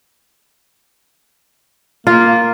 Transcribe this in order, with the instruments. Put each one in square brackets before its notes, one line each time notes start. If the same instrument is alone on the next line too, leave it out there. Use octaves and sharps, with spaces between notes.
[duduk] A#3 [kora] F4